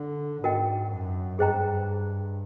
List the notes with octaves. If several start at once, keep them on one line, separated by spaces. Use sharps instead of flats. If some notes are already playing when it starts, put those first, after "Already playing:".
Already playing: D3
G#2 F#4 A#4 D#5 G5
F#2
G2 G#4 C5 D#5 G5 A#5